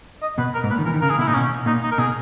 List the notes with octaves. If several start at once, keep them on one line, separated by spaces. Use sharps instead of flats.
D#5
B2 B4
A#4
G#2
A#2 B4
D#3
E3 A#4
D#3
C#3 A#4
G#4
B2 E4
A#2 D#4
B2 C#4
A#2 D#4
D#4
A#4
B2 G#4